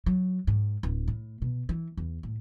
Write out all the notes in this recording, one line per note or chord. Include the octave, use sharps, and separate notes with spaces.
F#3
G#2
D1
A2
B2
E3
E2
A2